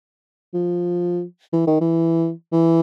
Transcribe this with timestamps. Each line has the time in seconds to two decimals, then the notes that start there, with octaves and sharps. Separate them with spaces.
0.54 F3
1.53 E3
1.67 D#3
1.81 E3
2.52 E3